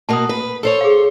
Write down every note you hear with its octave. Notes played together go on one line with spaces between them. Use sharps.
B2 A#3 F#4 A5 D#6
B4
A4 C5 C#5
G#4 F5